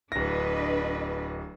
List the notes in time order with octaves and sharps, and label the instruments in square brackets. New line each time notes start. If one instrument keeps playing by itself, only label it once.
[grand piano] D1 A#6 [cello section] D4 B4 D#5